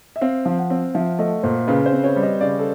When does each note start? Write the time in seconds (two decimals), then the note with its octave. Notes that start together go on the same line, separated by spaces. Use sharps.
0.16 E5
0.21 C4 F5
0.45 F3
0.58 F#5
0.70 C4
0.94 F3 E5
1.19 A3 D#5
1.43 A#2 C5
1.68 C#3 B4
1.86 C5
1.92 C4
2.04 C#5
2.16 G3
2.23 D#5
2.41 C#3 D5
2.59 A4